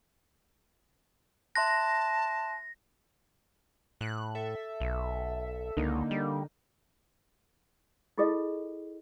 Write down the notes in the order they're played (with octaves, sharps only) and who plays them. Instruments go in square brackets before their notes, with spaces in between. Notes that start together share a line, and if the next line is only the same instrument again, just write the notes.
[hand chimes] E5 C6 F#6 [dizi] A5 [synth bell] A#6
[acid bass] A2 [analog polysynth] F#6
[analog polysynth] A4 E5
[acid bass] B1
[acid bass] C#2 [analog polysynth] D3 A#3 D#4
[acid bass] G3
[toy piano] E4 F4 G#4 A4 D#5